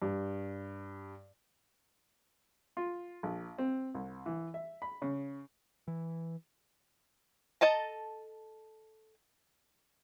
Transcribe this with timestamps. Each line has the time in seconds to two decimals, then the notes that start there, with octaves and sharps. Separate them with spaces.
0.02 G2
2.77 F4
3.23 A#1
3.58 C4
3.95 C2
4.26 E3
4.54 E5
4.82 B5
5.02 C#3
5.88 E3
7.61 A4 D#5 A5 A#5